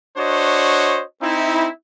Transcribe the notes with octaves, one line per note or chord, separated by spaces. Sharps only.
D4 F#4 C5 C#5 D#5
C4 D#4 E4